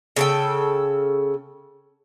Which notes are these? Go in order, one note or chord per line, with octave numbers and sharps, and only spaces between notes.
C#3 A4 G5